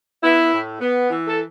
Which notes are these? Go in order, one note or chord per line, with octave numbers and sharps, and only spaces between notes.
B3 E4
A2
B3
E3
A4